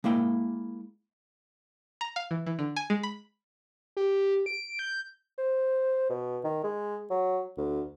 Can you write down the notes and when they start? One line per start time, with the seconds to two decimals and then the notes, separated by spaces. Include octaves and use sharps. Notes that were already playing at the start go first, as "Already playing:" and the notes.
0.04 G#3 A#3 E4 G5
2.01 A#5
2.16 F5
2.31 E3
2.47 E3
2.59 D3
2.76 G#5
2.90 G#3
3.03 B5
3.97 G4
4.46 D7
4.79 G6
5.38 C5
6.10 B2
6.44 D#3
6.64 G#3
7.10 F#3
7.57 D2